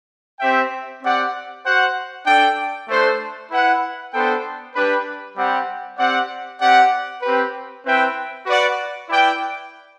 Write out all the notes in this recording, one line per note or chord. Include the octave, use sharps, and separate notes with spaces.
C4 G4 C5 E5 G5
C4 G4 D5 F#5
F#4 C5 F#5
D4 A4 D5 G5
A3 D4 A4 C5
E4 B4 F#5
B3 D4 A4 C5 G5
G3 D4 G4 B4
G3 C4 G4 C5 F#5
C4 G4 D5 F#5
C4 G4 D5 F#5
C4 G4 B4
C4 E4 B4 E5 G5
F#4 B4 D5 F#5
E4 B4 D5 G5